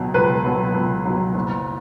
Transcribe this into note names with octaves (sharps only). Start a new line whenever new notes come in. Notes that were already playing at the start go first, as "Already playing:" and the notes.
Already playing: C#2 B2 F#3
C#2 B4
B2 F#3
C#2
B2 F#3
F#1